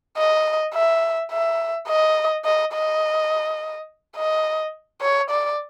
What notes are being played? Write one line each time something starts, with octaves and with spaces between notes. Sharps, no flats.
D#5
E5
E5
D#5
D#5
D#5
D#5
C#5
D5